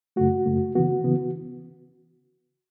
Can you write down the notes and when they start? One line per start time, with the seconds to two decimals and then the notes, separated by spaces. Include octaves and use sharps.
0.16 F#2 C#3 A3 F#4
0.46 F#2 C#3 A3
0.75 C#3 E3 B3 F#4
1.04 C#3 E3 B3